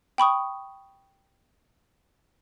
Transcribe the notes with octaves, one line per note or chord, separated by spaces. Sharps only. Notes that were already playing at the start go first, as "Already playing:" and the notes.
G5 B5 C#6 D#6